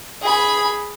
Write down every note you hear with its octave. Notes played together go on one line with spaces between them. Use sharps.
G#4 B5